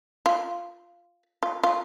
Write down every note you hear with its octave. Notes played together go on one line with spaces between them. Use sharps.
F4
F4
F4